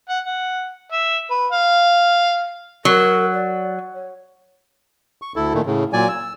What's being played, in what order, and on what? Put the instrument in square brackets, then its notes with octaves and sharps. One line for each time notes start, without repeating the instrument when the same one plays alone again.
[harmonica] F#5
F#5
E5
B4
F5
[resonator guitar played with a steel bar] F#3 [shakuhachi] A#4
[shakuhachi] D5
C#5
[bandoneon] C#6
D2 E4 A4
A#2 D#3 A3
A2 C#3
A#2 F#3 D5 G#5
E6